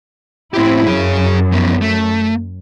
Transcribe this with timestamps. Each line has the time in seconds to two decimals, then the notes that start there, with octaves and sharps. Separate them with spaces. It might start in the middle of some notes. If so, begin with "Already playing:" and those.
0.54 A2 C4 E4 G4
0.86 F#2 G#4 C#5
1.52 F3 B3
1.81 A3